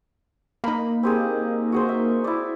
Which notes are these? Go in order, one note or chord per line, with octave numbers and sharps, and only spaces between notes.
A#3 D#4 B5
C4 G4 G#4
F#4 G#4 C5
E5
E4 D5